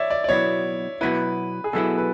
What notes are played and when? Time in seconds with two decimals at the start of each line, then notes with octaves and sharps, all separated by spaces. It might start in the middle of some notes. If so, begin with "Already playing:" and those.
Already playing: C#5 D5 E5
0.10 D5
0.24 D5
0.29 B2 F#3 B3 E4 C#5
1.01 B2 F#3 B3 E4 B4
1.64 G#4
1.73 B2 F#3 B3 E4 A4
1.98 B4